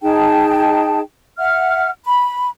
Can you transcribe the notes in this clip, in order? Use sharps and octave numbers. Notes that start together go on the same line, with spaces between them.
D#4 G#4 G5 A5
E5 F#5 F6
B5